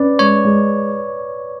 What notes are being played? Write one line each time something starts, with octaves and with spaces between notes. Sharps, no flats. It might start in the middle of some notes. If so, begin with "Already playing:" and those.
Already playing: C#4 B4 D5
G#3 C#5
G#3